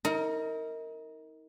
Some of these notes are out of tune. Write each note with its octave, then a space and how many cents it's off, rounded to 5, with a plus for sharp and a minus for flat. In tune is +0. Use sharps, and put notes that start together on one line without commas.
D#4 +35 A#4 -15